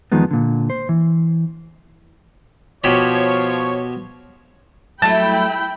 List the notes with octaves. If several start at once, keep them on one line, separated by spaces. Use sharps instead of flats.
E2 D#3 F3 G#3 B3
A#2 D3
C5
E3
B2 F3 G4 C#5 B5
F#3 G3 A3 E4 G5 A5 B5